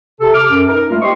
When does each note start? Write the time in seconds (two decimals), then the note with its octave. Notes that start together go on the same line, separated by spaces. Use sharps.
0.20 C3 A4
0.33 D6 F6
0.49 F#2
0.68 D#4 A#4
0.89 G3 A3 A#3 F4
1.01 G4 C5 D#5 C6 C#6